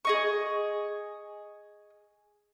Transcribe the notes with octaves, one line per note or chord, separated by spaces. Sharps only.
G#4 D#5 C#6